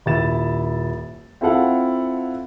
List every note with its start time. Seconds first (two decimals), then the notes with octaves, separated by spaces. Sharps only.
0.06 D#1 E4 A6 E7
1.41 C4 E4 F4 A4 F5 F#5